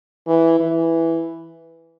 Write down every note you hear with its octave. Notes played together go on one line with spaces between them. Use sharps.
E3
E3